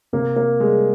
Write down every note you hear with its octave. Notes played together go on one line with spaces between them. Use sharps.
C3 A#3
A#3
G3 G#3